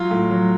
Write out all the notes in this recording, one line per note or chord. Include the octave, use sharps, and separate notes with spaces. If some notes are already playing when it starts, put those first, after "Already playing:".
Already playing: F#3 F4
A2
F#3